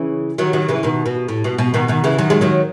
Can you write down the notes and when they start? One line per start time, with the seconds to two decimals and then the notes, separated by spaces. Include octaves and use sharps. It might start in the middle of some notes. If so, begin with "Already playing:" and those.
Already playing: C#3 E3
0.38 D#3 F#3
0.53 D#3 F#3
0.69 C#3 E3
0.83 B2 D#3
1.06 B2
1.28 A2
1.44 B2
1.58 B2
1.74 B2 D#3
1.88 B2 D#3
2.04 C#3 E3
2.18 D#3 F#3
2.30 G#3
2.41 D#3 F#3